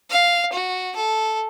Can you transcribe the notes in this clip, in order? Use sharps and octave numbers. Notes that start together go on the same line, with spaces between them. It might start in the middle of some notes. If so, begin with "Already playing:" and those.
F5
F#4
A4